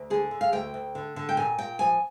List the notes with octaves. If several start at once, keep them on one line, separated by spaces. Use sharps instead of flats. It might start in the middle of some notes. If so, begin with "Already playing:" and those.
Already playing: D2
D3 G#4
D3
F5
D2 G5
D2
D3
D3
G5
A#2 G#5
A#2 G5
F3 G#5